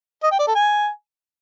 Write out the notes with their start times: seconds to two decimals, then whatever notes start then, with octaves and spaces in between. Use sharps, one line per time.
0.23 D#5
0.31 G5
0.39 D5
0.47 A4
0.55 G#5